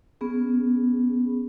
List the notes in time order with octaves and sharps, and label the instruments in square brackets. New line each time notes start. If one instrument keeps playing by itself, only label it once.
[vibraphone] B3 C#4 G#4